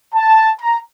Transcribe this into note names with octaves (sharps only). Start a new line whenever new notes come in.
A5
A#5